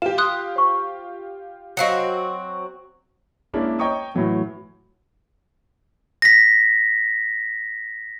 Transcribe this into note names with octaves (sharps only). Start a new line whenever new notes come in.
F4 G4 E7
C6 D#6 F#6
C5 C#6
F#3 C4 F#4 D#5 F5 F#5 C#7
G#3 A#3 C#4 D4 E4
C#5 D#5 G5 A#5 C#6 D#6
A2 E3 F#3 A3
A#6 B6